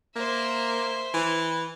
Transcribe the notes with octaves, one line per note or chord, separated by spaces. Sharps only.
A#3 C5 E5
E3